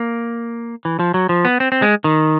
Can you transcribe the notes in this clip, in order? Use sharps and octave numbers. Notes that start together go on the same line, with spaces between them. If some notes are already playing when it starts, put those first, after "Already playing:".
Already playing: A#3
E3
F3
F#3
F3
B3
C4
C4
G#3
D#3